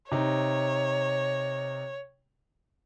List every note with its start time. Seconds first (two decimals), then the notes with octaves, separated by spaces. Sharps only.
0.11 C3 D#4 C#5